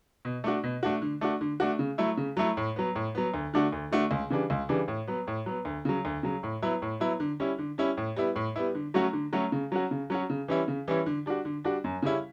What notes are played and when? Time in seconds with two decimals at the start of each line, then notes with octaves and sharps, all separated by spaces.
0.25 B2
0.44 A3 D4 F#4
0.64 B2
0.83 A3 D4 F#4
1.02 D3
1.21 A3 D4 F#4
1.41 D3
1.60 A3 D4 F#4
1.79 C#3
1.98 F#3 A3 E4
2.17 C#3
2.37 F#3 A3 E4
2.57 A2
2.76 F#3 B3
2.95 A2
3.15 F#3 B3
3.34 D2
3.54 D3 A3 D4 F#4
3.72 D2
3.91 D3 A3 D4 F#4
4.11 C#2
4.30 C#3 E3 G3 D4
4.50 C#2
4.69 C#3 E3 G3 D4
4.88 A2
5.07 F#3 B3
5.27 A2
5.46 F#3 B3
5.65 D2
5.85 C#3 F#3
6.05 D2
6.23 C#3 F#3
6.43 A2
6.62 F#3 B3 E4
6.82 A2
7.00 F#3 B3 E4
7.20 D3
7.40 G3 C#4 E4
7.59 D3
7.78 G3 C#4 E4
7.97 A2
8.16 G3 B3 E4
8.36 A2
8.56 G3 B3 E4
8.75 D3
8.94 F#3 A3 C#4 F#4
9.13 D3
9.33 F#3 A3 C#4 F#4
9.52 C#3
9.72 F#3 C#4 F#4
9.91 C#3
10.10 F#3 C#4 F#4
10.30 C#3
10.48 E3 G3 C#4 E4
10.68 C#3
10.88 E3 G3 C#4 E4
11.06 D3
11.26 G3 D4 F#4
11.45 D3
11.64 G3 D4 F#4
11.84 F#2
12.02 C#3 G3 C#4 E4